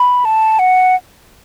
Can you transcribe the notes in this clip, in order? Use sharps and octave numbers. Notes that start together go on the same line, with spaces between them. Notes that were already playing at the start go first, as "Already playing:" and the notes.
Already playing: B5
A5
F#5